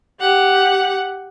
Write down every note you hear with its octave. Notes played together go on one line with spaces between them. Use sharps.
G4 F#5